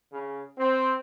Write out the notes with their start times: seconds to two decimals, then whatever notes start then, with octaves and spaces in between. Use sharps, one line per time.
0.13 C#3
0.57 C4